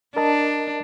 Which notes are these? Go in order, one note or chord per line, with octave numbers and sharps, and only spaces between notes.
D4 A#4 D#5 A5